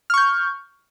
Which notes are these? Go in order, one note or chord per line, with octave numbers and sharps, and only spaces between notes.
C#6 F6 G6